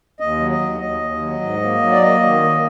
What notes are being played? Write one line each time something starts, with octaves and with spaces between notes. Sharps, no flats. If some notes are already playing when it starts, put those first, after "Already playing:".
D#2 D#5
F#3
D#5
D#2
D#2 D#5
D#2
F#3
G#2
A#3
F#3
D5
A#3 D#5
D#3
A#3